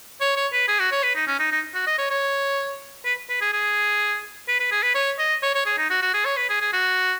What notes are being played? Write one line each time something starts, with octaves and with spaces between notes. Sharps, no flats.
C#5
C#5
B4
G#4
F#4
C#5
B4
D#4
C#4
D#4
D#4
F#4
D#5
C#5
C#5
B4
B4
G#4
G#4
B4
B4
G#4
B4
C#5
D#5
C#5
C#5
G#4
D#4
F#4
F#4
G#4
C#5
B4
G#4
G#4
F#4